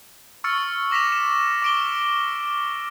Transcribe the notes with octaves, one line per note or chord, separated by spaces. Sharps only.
C#6 E6 F6 A6 C#7
D6 A#6 B6 E7 F7
E7
D6 D7 G7